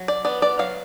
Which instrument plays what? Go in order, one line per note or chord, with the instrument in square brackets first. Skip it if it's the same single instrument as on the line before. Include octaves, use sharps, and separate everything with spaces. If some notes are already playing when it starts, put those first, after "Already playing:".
Already playing: [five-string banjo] F#3
D5
B3 D5
D5
F#3 F5